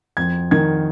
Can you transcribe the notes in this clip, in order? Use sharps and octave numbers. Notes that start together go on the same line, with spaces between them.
F2 G#6
D#3 G#6